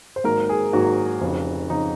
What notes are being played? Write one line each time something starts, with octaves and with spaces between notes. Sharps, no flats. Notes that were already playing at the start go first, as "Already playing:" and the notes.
C5
G#1 G#2 F#3 A#3 A#4
G#4
G#1 G#2 F#3 A#3 F#4
F1 F2 C#3
F1 F2 C#3 D#4